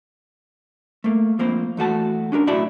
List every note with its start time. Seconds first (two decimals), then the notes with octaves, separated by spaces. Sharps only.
1.04 A3 A#3
1.39 F3 A#3 C4 A#4 C5
1.77 E2 A3 F#4 A5
2.32 C#4 D4 G4 A#4
2.47 B1 A2 E4 F#4 D5 A5